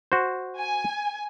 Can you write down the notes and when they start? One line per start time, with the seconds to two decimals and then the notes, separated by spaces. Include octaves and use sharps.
0.12 F#4 C5
0.58 G#5